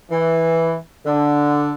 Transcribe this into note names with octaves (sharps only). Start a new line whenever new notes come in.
E3
D3